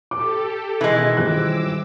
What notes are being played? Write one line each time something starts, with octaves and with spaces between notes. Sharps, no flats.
G4 A4 D6
B2 D#3 E3 G#3
D#1 D#2 D6 E6 F#6